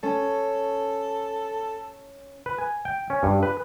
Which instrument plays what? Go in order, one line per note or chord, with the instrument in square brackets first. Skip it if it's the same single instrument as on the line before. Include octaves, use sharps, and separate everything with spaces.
[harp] C#4 [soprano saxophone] A4
[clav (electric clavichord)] B4
G#5
G5
C#4
G2
B4